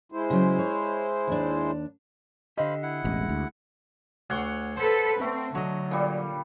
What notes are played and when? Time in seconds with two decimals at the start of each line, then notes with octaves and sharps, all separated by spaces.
0.12 G#3 E4 C5
0.30 C#3 F#3
0.58 C#5
1.27 D#2 D4
2.58 D3 G4 C5 D#5 F5 B5
2.83 E4 F#5
3.04 E1 A1 G#3
3.29 D2
4.30 D2 C#5 F#5 C6
4.77 A4 B4 C5
5.21 A3 C4
5.55 D3 F#3 D#5
5.91 A#2 G3